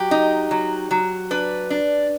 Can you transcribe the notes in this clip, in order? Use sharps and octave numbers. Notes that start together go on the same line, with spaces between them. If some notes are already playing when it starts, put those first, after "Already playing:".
Already playing: F#3 G4
D#4
F#3
F#3
D4 B4
D4